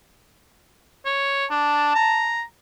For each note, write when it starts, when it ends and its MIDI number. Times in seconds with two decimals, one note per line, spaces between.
1.05 1.45 73
1.51 1.93 62
1.51 2.40 81
1.95 2.42 82